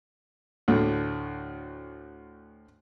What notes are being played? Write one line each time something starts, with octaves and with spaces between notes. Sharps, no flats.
D2 A2 D3